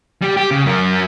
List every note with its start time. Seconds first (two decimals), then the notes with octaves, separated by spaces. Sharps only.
0.22 G3 G4
0.37 G4
0.51 C#3
0.66 F#2 A#4